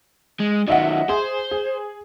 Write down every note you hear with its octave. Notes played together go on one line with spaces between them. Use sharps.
G#3
D#3 F#3 D#5 E5 F#5
G#4 C5
G#4